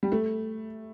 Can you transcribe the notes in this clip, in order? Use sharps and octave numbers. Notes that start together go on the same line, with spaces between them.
G3
A3